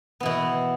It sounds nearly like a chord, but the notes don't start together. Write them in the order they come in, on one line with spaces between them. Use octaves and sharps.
B3 E3 B2